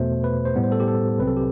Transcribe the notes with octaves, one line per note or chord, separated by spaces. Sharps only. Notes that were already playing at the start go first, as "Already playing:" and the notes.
Already playing: E2 B2 A3 C5
B4
C5
A2 G3 B3
C5
A4
G4
A4
C2 C3 F#3 C4 B4
A4
G4